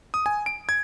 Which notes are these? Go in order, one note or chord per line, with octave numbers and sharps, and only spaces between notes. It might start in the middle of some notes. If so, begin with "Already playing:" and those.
D#6
G#5
D7
G#6